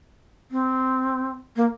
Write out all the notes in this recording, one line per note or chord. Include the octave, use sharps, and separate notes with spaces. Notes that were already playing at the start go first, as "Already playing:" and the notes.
C4
A#3